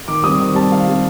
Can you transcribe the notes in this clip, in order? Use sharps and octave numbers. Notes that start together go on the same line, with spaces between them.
D#3 D6
G3 C4 D#6
D#3 D#6
G3 C4 A5
D#3 F5
G3 C4